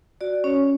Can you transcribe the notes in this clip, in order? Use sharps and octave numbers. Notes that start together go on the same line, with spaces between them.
F#4 D5
C#4 C#5